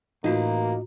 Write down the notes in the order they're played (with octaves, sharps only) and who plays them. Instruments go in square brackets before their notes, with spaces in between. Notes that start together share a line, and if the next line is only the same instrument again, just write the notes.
[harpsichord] A1 [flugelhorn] A#3 [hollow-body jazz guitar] D#4 [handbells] F4 F#4 A#5